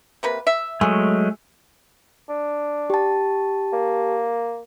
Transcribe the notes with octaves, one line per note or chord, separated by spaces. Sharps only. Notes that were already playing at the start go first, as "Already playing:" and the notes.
C3 A#3 B4
E5
F#3 G#3 A3 G#4
D4
G4 A5
A#3